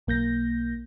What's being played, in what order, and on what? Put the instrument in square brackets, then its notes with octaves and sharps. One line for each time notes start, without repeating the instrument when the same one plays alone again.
[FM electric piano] B1 A#3 G6 A#6